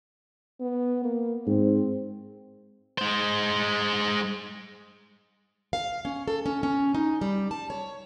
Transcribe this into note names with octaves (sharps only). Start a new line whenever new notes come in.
B3
A#3
G#2 C4
G#3 C5
F5
C#4
A4
C#4
C#4
D#4
G3
A5
C#5